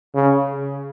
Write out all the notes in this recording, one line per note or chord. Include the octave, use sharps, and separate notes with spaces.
C#3